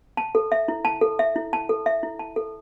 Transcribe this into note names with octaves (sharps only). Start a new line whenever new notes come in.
A5
A4
E5
E4
A5
A4
E5
E4
A5
A4
E5
E4
A5
A4